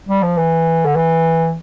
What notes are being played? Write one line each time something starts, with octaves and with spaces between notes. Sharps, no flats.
G3
F3
E3
D3
E3